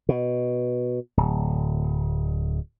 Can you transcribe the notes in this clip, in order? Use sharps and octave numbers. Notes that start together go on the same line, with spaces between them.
B2
D1